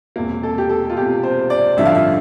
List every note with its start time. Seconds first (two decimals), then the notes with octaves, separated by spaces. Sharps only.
0.16 E1 E2 C3 A#3
0.43 A4
0.58 G4
0.69 A4
0.89 F4
0.97 E1 E2 C3 G4
1.23 C5
1.50 D5
1.77 A1 G2 D3 F3 E5
1.85 F5
1.95 E5